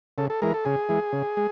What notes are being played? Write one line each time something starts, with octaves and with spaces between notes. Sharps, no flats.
C#3 A4
A4
E3 G#3 A#4
A4
C#3 G#4
E3 G#3
C#3
G#3